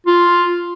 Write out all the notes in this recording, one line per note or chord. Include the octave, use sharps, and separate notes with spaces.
F4